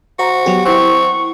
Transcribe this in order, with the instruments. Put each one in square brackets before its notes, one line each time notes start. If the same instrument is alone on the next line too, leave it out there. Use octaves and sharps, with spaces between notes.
[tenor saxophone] F#4 [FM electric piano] C5 A#5
[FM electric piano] F#3 B3 G4
[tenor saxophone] C4 [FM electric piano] E4 F#5 [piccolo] C#6